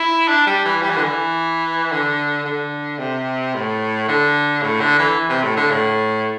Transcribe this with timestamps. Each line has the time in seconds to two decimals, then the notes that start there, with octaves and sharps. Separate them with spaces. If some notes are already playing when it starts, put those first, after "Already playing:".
Already playing: E4
0.28 D4
0.47 G3
0.65 E3
0.82 G3
0.90 E3
0.96 D3
1.04 E3
1.92 D3
2.45 D3
2.99 C3
3.54 A2
4.08 D3
4.62 A2
4.80 D3
4.99 E3
5.29 C3
5.43 A2
5.57 D3
5.71 A2